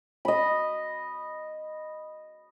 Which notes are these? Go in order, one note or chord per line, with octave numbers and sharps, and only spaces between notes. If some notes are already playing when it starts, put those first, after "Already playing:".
D#5 B5